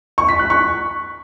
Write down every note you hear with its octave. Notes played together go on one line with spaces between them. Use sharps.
C#6
B6
F#6
C#6